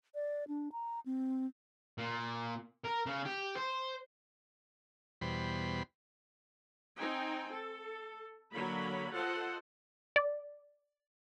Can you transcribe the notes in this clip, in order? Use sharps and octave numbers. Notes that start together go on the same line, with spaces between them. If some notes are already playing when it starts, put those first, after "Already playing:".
D5
D4
A#5
C4
A#2
A#4
C#3
G4
C5
E2 B2 G3 C5 B5
C4 D#4 G5 G#5
A4
D3 F#3 A#3 C#5 B5
F4 A4 C5 D#5 F#5
D5